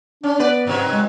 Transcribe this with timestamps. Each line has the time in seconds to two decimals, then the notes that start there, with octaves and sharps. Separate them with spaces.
0.23 C#4 D4
0.39 B3 B4 D5
0.67 G#2 C3 D#3 F#3
0.92 G#3